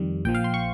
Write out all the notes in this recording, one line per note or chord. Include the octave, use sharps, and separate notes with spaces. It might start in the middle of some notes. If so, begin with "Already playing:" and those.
Already playing: F2 D#3 G3
A#1 A#2 F3 G5
F5
C6
C#6